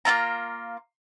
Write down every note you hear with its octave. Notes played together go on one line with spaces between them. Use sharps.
A#3 C4 F4 A#5